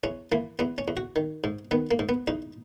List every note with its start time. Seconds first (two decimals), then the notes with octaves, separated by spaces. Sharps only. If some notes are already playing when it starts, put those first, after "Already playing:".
0.04 E2 C#4
0.32 E3 A#3
0.59 E2 B3
0.78 C#4
0.88 E2
0.97 F#4
1.16 D#3
1.44 G#2
1.71 D#3 B3
1.91 A#3
1.99 G#2
2.09 B3
2.28 E2 D#4